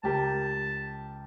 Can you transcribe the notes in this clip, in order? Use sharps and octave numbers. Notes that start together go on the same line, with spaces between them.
C#2 G4 A#4 A5